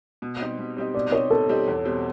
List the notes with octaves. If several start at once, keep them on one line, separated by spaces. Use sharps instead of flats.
B2
G3 C4 D#4 G4
B2
G3 C4 D#4 G4
B2 D5
G3 C4 D#4 G4 C#5
B2 A4
G3 C4 D#4 G4
E2
B2 G3 C4